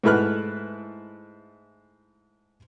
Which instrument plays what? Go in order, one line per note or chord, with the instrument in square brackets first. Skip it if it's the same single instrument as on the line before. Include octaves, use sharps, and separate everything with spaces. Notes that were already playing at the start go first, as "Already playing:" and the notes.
[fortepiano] G#2 A3 E4 B4 F6 F#6